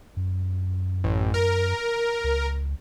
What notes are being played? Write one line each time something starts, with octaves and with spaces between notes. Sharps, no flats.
F#2
A1
A#4
C#2